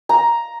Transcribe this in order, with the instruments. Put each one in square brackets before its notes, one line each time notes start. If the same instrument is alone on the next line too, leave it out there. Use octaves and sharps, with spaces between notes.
[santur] A#5